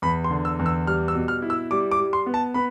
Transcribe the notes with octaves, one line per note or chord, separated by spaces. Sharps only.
E2 B5
C6
D3
E6
E2
E6
G3 F6
E6
B2
F6
E4
E6
G3 D6
D6
G3
C6
B3
A5
B3 B5